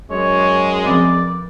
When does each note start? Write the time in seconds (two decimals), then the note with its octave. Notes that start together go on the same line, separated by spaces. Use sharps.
0.11 F#2 G#3 C#5
0.86 F3 C4 D5